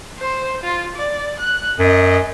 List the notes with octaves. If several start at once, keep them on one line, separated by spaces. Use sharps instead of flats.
C5
F4
D5
F#6
F#2 D#5